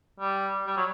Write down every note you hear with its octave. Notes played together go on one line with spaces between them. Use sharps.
G3
G3
F#3